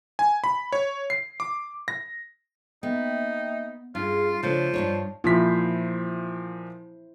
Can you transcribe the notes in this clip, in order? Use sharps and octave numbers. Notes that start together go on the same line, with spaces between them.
G#5
B5
C#5
C7
D6
A#6
A#3 B3 D#4 E5 G5
G2 C#4 F4 G#4
C#3 F3 A3 D4 C#5
G2 A#2 C#5 D5 A5
A#2 F3 E4 C5 B6